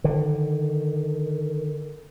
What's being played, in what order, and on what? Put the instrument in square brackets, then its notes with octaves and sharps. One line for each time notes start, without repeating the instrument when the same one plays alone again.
[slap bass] D3 D#3